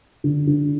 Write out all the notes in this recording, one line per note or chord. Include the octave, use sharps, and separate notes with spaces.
D3
D3